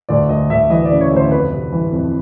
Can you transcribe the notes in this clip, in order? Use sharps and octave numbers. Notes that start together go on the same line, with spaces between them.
D2 D5
D2 D#5
D2 E5
E3 D#5
D5
C#3
C#5
D2 C5
F2 B4
C3
E3
F2